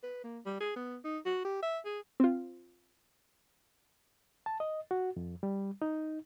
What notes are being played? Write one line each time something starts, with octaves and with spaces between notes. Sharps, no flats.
B4
A#3
G3
G#4
B3
D#4
F#4
G4
E5
G#4
C4 F4
A5
D#5
F#4
F2
G3
D#4